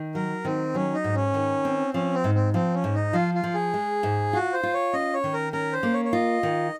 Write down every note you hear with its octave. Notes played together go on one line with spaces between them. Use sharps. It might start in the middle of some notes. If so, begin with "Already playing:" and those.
Already playing: D#3
F#3 A#4
D#3 C4
F#3 C#4
D#4
G#2
C#4
D#3
C4
F3 C#4
C4
G#2
C4
F3 C4
C#4
G#2
D#4
F3 F4
F4
F3
G#4
G#3
G#2
F4 F#4
C5
F4
C#5
C#4 D#5
C#5
D#3
A#4
C#4 A#4
C5
A#3
C#5
C#5
F4 D#5
D#3